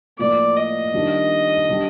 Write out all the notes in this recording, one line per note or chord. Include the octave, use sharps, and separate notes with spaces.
A2 F3 A#3 F4 D5
D#5
D#3 G3 D4 F4
D3 G3